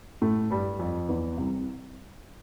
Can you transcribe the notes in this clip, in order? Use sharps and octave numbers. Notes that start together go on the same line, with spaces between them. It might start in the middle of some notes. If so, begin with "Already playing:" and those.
A2 A3
G2 G3
F2 F3
E2 E3
C2 C3